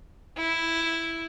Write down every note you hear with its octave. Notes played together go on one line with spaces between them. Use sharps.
E4